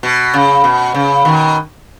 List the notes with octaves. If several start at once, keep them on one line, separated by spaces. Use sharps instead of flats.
B2
C#3
B2
C#3
B2 D#3